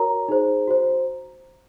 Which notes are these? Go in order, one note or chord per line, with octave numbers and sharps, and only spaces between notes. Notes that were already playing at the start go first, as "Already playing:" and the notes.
Already playing: F#4 A#4 C#5 A#5
D#4 G#4 C5
F#4 C5